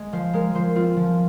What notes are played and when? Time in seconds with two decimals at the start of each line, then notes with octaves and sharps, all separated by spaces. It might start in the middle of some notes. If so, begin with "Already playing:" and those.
Already playing: G#3 D#5
0.13 F3 C5
0.33 G#3 A#4
0.55 F3 C5
0.75 C4 F4
0.97 F3